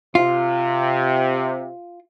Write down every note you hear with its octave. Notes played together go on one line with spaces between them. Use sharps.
C3 F4